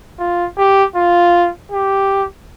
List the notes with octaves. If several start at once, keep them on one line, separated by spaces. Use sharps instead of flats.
F4
G4
F4
G4